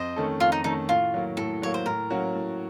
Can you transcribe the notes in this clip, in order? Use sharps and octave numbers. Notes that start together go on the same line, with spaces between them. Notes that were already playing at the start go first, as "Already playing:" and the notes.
Already playing: F2 C5 D#5
D#3 A3 C#4 A4
F2 F4
D#4
D#3 A3 C#4 D#4 A4
A2 F4
F#3 A#3
A2 A4
F#3 A#3 C#5
C5
A2 A#4
F#3 A#3 C#4 F#4
A2